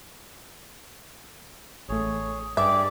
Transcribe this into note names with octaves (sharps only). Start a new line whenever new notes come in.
A1 A3 G#4 C#5
G2 G4 G#4 D5 E5 D6